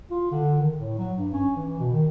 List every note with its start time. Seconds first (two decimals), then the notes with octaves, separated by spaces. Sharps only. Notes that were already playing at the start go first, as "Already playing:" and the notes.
0.11 F4
0.31 D3
0.60 D#3
0.77 A2
0.98 F#3
1.17 G2
1.33 C#4
1.56 E3
1.79 B2
1.92 D#3